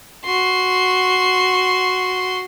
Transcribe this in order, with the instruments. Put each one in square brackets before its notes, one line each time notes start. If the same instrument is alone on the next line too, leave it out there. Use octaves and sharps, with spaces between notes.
[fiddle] F#4 C6